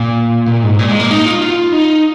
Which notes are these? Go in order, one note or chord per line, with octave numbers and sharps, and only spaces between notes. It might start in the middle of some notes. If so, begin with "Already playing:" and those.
Already playing: A#2
A#2
G#2
A#2
G#3
A#3
D#4
F4
F4
D#4